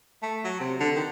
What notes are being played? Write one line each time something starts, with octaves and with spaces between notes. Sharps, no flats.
A3
F#3
C3
D3
D#3